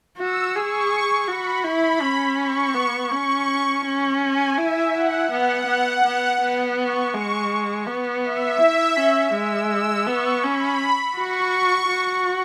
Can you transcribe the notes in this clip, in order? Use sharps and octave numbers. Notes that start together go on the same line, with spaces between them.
F#4 E6
G#4 C#6
F#4 B5
E4 B5
C#4
C#6
B3
C#4 C#6
C#4
G#5
E4 E5
F#5
B3 F#5
B3
B3
B3
C#6
G#3 C#6
B3
E5
E4
C#4
G#3 E6
E6
B3 C#6
C#4 B5
F#4 C#6
F#4